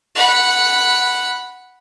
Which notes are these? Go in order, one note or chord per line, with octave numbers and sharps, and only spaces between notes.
F#5 B5